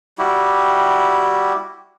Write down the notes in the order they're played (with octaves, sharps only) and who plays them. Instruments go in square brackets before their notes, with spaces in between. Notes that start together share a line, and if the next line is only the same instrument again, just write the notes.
[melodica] G3 E4 F#4 G4